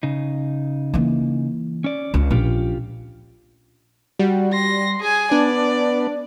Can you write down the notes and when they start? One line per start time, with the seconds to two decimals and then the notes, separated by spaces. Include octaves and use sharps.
0.03 C#3 D#4
0.94 E3 A#3
1.84 C#4 D5
2.14 C#2 C#4
2.31 A#1 C#4 F4 G4
4.19 G3 F#4
4.53 C6 A#6
5.00 G#4 G#5
5.31 B3 D4 D5